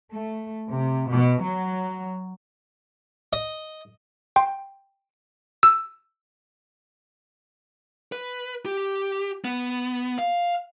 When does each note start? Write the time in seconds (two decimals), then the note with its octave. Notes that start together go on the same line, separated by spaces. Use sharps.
0.12 A3
0.71 C3
1.10 B2
1.44 F#3
3.33 D#5
4.36 G5 C6
5.63 E6
8.12 B4
8.66 G4
9.45 B3
10.18 F5